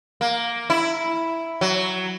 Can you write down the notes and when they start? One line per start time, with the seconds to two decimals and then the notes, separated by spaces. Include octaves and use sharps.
0.21 A#3
0.70 E4
1.61 F#3